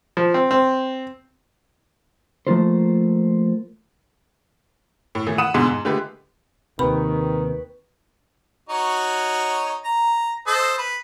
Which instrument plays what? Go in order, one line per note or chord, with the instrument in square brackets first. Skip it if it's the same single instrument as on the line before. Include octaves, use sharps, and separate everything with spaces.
[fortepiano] F3
C4
C4
[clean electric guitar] F3 A3 A#3 F4 A4 C5
[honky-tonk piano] A2
A2 E3 A3
F#5 B5 D#6 D#7 E7
E2 G#2 B2 D3
G#2
D3 G#3 A3 G4 B4
[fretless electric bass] D#2 C3 [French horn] D#3 [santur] B4 G5 C#6 [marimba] B5
[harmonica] D#4 F#4 C#5
A#5
A4 C5 D#5
B4